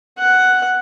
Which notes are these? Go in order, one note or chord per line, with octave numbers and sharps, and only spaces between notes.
F#5